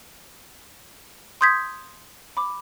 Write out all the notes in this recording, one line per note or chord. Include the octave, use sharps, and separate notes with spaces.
C6 D#6 G6 G#6 B6
B5 D6